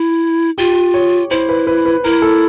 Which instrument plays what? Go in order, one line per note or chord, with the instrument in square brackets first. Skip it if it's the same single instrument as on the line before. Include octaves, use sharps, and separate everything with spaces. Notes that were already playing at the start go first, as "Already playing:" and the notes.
Already playing: [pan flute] E4
[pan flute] F4 [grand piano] G4
[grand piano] C#5
[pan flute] E4 [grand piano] C5
[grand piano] B4
B4
B4
[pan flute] E4 [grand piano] A#4
[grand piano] A4